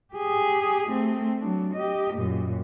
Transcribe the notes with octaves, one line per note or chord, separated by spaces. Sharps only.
G4 G#4
A3 C4
F#3 D4
G4 D#5
F#2 A#2